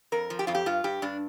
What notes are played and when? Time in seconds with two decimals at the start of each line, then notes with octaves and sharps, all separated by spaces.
0.12 F2 A#4
0.30 F3
0.39 G4
0.47 F2 F4
0.55 G4
0.66 G2 F4
0.84 G2 G4
1.02 G2 D4